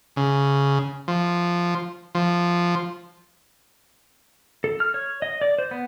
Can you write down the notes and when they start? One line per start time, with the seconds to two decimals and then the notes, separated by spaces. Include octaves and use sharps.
0.16 C#3
1.08 F3
2.15 F3
4.64 A4
4.80 F6
4.94 C#5
5.22 D#5
5.42 D5
5.59 C5
5.71 B3